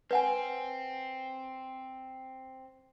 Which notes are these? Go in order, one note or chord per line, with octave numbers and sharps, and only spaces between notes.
C4 B4 F#5 G#5